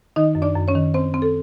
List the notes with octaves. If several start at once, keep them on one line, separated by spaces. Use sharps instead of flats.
D#3 D#4 D#5
F#2
D4 D5
F#2
C#4 C#5
D#3
C4 C5
C4
A4